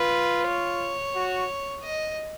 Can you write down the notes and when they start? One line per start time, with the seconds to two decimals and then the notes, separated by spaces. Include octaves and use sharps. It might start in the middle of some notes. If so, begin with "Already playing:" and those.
Already playing: F4 B4
0.48 C#5
1.15 F#4
1.83 D#5